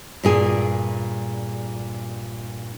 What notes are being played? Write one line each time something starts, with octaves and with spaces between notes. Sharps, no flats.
G2 A#2 G#4